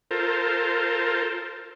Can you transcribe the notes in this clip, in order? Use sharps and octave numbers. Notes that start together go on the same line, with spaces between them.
F4 A4 A#4 C5